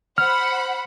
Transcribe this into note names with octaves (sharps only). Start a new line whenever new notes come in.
C5 F#5 B5 F6